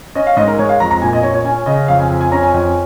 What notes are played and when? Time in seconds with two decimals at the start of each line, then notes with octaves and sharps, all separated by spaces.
0.15 C#4 D#5
0.27 F5
0.37 G#2 D#5
0.47 A#4
0.58 G#3 C#5
0.69 F5
0.80 F2 A#5
0.91 A#5
1.01 A#2 G#5
1.13 D#5
1.23 A#2 C#5
1.34 C#5
1.44 C#4 G#5
1.66 C#3 D#5
1.88 F2 F5
1.99 G#5
2.10 F2
2.21 G#5
2.31 C#4 A#5
2.43 G#5
2.54 F2